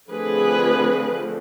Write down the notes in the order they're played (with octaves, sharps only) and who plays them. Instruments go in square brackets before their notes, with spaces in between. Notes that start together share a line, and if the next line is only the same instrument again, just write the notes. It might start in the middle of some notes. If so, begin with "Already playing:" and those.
[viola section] D3 F3 A3 C4 G#4 B4